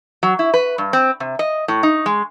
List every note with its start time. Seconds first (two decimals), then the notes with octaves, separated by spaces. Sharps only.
0.23 F#3
0.39 E4
0.54 B4
0.78 G2
0.93 C4
1.20 C3
1.39 D#5
1.68 A2
1.83 D#4
2.06 G#3